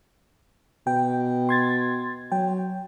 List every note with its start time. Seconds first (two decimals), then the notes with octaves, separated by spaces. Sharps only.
0.87 B2 G5
1.49 C6 G#6 A6
2.32 F#3 G5